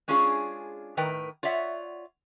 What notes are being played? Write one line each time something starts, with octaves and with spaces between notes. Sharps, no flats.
G#3 C#4 D4 F4 G#4
A2 D#3 A#4 B4 G5
F4 C#5 D5 E5 F#5